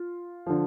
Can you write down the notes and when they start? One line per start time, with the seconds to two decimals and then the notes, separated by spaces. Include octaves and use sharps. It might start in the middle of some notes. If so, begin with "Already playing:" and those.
Already playing: F4
0.47 D3 F3